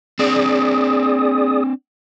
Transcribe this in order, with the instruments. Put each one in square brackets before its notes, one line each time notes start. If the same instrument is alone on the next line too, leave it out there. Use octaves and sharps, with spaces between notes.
[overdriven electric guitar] C4 D4 [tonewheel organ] G#4 D5 D#6